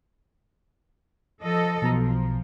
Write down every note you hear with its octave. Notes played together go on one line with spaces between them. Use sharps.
F3 A4 D#5
B1 B2 F3 A#5